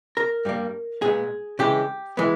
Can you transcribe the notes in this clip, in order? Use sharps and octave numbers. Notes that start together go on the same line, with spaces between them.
A#4
G2 G3 A#3
A#2 G#3 B3 G#4
C#3 E3 G#3 G4
E3 G#3 B3